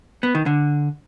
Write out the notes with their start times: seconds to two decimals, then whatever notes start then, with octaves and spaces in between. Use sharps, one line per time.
0.23 B3
0.35 D#3
0.46 D3